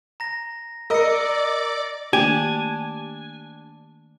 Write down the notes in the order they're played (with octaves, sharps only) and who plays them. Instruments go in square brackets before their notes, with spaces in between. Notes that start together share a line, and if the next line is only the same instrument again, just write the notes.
[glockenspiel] A#5 A#6
[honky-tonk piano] A#4 D#5 [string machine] D5 D6 [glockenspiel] E6 A#6 C#7
[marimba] D#3 A3 A#3 [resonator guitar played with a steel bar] D4 [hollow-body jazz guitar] G4 [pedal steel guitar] G#5